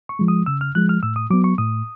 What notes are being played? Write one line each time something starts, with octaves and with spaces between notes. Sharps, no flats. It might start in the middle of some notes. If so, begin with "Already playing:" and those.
C#6
F3 G#3
D#6
C#3 E6
F6
F3 G#3 F#6
F6
A2 E6
D#6
F#3 B3 D6
C#6
A2 D#6